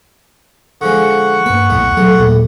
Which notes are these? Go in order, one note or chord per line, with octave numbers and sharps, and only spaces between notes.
D3 F3 G#3 F#5 C#6
G2 A#3 B4
B1 E2 A2 A3
B1 E2 F#3 A3
D#2 A#2 A#3